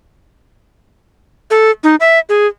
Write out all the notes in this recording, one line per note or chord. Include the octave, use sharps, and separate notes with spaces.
A4
D#4
E5
G#4